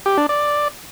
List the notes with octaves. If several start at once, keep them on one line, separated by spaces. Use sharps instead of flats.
G4
D4
D5